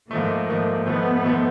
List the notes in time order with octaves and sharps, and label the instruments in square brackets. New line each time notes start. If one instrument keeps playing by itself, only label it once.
[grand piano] G#2 F3 A3 [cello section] A#3
[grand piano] G#2 F3 A3
[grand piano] G#2 F3 A3 [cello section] B3
[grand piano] G#2 F3 A3